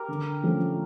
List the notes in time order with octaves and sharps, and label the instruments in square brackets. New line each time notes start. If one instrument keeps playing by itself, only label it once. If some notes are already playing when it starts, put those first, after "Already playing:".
Already playing: [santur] G4 A#4
[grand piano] D3
F3 A3 C#4